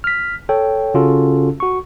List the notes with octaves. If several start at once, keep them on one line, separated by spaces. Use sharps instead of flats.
F6 B6
A4 C#5 G5
C#3 C#4 F4 F#4 A4
F#4 C#6